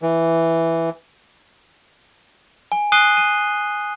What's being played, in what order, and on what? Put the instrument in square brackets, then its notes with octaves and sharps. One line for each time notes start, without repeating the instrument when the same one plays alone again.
[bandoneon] E3
[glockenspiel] G#5
G#5 D#6 F#6 C7 D#7 G7
D#7